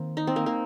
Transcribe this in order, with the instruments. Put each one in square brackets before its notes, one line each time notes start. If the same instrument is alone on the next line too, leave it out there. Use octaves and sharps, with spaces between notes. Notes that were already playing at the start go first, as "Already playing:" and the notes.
Already playing: [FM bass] D#3 [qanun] A#3 C4
[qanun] D#4
C4
A#3
A#3